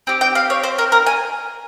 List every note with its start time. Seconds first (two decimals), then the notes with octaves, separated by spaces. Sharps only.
0.07 C4 G4
0.21 G5
0.35 F5
0.50 C#5
0.63 C5
0.78 A#4
0.92 A#4
1.06 G#5